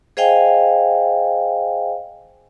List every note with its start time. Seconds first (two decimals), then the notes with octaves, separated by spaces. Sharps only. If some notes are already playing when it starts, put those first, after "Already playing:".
0.17 G#4 C5 D#5 F5 G5 G#5